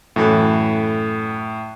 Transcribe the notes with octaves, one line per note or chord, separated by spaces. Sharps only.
F#2 A2 E3 A4